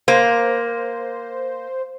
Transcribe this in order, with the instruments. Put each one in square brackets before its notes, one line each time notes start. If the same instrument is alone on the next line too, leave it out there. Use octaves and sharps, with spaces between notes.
[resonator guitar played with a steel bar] A#3 [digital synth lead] C5